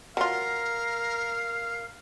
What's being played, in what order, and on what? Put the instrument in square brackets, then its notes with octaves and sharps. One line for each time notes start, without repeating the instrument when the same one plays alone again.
[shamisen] F#3 F4 [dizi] A#4 [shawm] F5